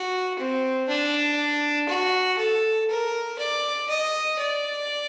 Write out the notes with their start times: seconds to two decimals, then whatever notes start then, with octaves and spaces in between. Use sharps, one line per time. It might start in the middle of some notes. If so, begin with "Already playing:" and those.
Already playing: F#4
0.39 C4
0.88 D4
1.89 F#4
2.38 A4
2.89 A#4
3.39 D5
3.89 D#5
4.39 D5